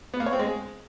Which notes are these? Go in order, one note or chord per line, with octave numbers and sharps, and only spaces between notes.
B3
A#3
C#5
C4
G#3